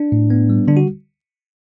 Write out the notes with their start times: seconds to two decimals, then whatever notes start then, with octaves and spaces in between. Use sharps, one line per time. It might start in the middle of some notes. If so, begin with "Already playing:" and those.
Already playing: D4
0.12 A2
0.30 B3
0.50 G3
0.68 D3 D4
0.77 F#4